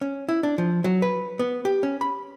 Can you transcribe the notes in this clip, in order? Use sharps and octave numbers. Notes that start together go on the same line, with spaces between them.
C#4
E4
D4
F3
F#3
B4
B3
G4
C#4
B5